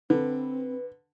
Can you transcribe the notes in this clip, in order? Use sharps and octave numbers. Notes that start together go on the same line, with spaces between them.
D3 C4 B4